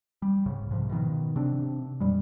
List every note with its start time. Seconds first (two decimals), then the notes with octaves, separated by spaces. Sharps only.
0.22 G3
0.46 C2 G#2 C#3
0.71 G#2 C3 E3 F3
0.90 B2 D#3
1.36 C3 C4 D4
2.00 F2 A#2 G3 G#3